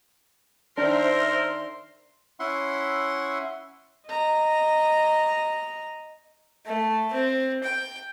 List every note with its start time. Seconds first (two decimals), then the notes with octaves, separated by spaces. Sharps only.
0.77 D#3 D4 A#4 C5 E5 C6
2.40 C#4 E4 E5 F#5 C6
4.08 D#5 A#5
6.66 A3
7.13 C4
7.64 G5